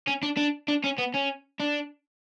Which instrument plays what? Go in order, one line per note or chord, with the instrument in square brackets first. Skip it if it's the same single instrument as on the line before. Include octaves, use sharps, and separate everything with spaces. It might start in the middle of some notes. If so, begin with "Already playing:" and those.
[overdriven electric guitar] C#4
D4
D4
D4
C#4
B3
C#4
D4